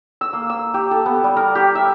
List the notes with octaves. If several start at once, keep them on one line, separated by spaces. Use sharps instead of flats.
E6
A#3
E6
G4
A4
B3
G3
A#4
G4
E5